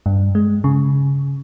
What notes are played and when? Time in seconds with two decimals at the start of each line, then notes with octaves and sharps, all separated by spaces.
0.06 G2
0.35 G#3
0.64 C#3